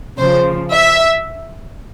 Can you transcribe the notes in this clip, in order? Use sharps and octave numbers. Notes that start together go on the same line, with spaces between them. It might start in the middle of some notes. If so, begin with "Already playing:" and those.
C#3 F3 C5
E5